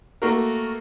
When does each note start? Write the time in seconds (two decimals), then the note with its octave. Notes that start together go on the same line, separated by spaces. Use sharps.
0.22 A3 A#3 F#4 A#4